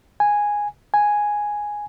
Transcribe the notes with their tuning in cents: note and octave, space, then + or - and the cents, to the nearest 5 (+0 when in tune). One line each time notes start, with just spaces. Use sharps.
G#5 -5
G#5 +0